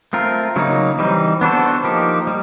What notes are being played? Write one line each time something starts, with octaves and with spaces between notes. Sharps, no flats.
A3 C4 F4 A#4
C#3 F#3 A#3 D#4
E3 G3 C4 D#4
B3 D4 F#4 A4 C5
F3 A#3 D#4 G4
G3